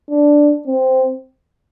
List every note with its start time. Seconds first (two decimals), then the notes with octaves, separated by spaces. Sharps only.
0.10 D4
0.67 C4